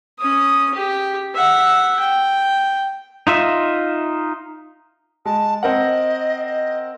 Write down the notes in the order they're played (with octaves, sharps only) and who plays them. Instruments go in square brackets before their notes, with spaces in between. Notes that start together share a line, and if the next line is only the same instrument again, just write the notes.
[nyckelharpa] C#4 D#6
G4
E5 F#5
G5
[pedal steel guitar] D#4 F4 E5
[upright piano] G#3 [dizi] A5
[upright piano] C4 A#4 F#5 [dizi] D#5
[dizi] D#5